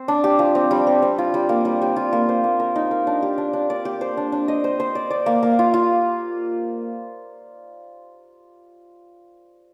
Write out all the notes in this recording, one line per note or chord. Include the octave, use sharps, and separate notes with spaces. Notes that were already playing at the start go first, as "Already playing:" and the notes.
Already playing: C4 C5
D4
G4
F3
C4
G3
C4
C4
F4
G3
A#3
G3
G3
F4
A#3
C5
A#3
A#4
D#4
A#4
D4
G4
D4
D4
D5
G4
C5
D4
D4
D#5
C5
C5
D5
D5
A#3
A#3
F4
F4